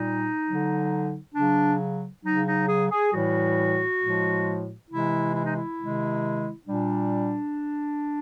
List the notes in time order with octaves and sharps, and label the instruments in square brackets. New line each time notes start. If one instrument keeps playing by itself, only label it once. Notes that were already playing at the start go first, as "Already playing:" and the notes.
Already playing: [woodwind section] A#2 G3 D#4
D3 F#3
C#3 F#3 D4
C#3 F#3 D#4
D#4
G#4
G#4
A2 E3 G3 F#4
A2 F3 G#3
C3 E3 G#3 E4
E4
D#4
E4
C3 D#3 G#3
A#2 G3 D4